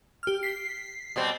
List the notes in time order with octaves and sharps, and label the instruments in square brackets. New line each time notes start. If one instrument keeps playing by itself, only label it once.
[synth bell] G4 F6
B6 C7
[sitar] B2 G3 C4